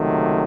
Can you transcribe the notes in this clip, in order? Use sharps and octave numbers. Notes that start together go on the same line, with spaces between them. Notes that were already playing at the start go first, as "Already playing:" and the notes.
Already playing: C#2 C3 D#3 F#3 A3